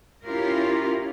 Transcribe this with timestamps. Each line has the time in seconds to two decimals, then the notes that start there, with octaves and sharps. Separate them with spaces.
0.25 C#4 E4 F4 G4 A#4